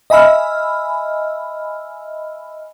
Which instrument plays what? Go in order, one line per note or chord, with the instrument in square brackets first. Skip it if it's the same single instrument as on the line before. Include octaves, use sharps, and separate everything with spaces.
[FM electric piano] D#5 E5 G#5 B5 E6 F6